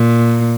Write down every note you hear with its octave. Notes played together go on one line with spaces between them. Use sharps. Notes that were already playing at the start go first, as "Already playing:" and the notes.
Already playing: A#2